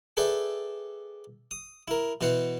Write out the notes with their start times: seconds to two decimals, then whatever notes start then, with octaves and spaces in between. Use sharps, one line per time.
0.17 G#4 A4 B4 D5 E5 G5
1.51 D#6
1.88 E4 A#4
2.21 B2 E3 B3 C5 F#5